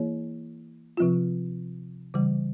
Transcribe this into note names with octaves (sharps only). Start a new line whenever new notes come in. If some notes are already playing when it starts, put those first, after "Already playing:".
Already playing: E3 A#3 E4 G#4 C#5
C3 F3 C4 F4
C#3 E3 G3